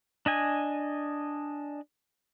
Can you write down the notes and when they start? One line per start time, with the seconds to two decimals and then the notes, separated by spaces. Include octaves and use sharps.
0.26 D4 D#5 G#5